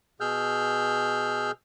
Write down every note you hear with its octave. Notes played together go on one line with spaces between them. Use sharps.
B2 G#4 E6 F6 G6